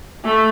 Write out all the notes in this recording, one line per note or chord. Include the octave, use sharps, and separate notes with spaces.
A3